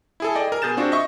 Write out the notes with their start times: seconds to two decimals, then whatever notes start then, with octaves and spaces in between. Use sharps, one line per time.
0.20 E4 G#4 A4
0.35 D5 D#5 G5
0.48 G#4 A#4
0.62 B2 G#4 G6 A6 E7
0.77 C4 D4 F4 F#4
0.92 D#5 E5 C#6